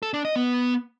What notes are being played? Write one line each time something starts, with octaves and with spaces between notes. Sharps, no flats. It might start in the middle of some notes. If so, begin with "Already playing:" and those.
A4
D4
D#5
B3